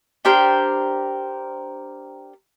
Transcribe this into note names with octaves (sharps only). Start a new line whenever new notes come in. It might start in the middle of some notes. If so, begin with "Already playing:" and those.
D4 G4 A#4 C5